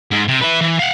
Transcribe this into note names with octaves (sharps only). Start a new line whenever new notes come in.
G#2
C3
B4 E5
E3
F5 F#5